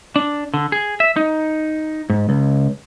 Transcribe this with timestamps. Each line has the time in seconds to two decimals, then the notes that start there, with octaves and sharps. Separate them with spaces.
0.16 D4
0.54 D3
0.72 G#4
1.00 E5
1.16 D#4
2.10 G#2
2.29 C#2